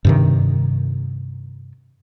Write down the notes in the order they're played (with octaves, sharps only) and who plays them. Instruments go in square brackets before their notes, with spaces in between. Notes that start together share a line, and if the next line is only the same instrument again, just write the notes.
[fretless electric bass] G2 C3 D#3